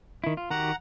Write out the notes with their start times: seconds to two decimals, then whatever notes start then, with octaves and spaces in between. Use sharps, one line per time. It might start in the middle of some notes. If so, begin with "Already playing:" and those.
0.24 D#3 E4
0.37 F4
0.50 D#3 F#4 G4 F#5 A#5